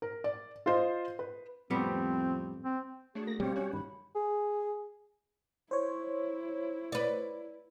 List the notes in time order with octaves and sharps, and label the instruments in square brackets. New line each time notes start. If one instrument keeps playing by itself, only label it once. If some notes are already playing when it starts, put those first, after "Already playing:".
[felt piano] A#4
D5
F4 C5 D#5
B4
[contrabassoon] F2 [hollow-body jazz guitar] A2 G3 B3 [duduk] C4
[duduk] C4
[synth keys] A3 D4 F#4 [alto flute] G#4 [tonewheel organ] C#5
[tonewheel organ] A#3 A#6
[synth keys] B2 F5 [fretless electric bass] G3 [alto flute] C4 [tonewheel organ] G4 C#5
[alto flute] C#4 [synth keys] F#4 F#6
[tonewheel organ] G2 D#3 [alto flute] B5
[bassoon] G#4
[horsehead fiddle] E4 [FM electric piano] C5 C#5
[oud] B4 D5